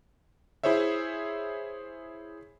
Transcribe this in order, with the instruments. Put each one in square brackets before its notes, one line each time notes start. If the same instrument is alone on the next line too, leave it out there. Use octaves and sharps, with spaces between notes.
[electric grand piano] E4 G#4 C5 C#5 E5